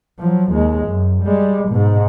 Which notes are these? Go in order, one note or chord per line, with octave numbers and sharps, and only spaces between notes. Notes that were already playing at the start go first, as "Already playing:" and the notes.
F3 F#3
D#2 G#3
F#2
G3 G#3
G#2 B2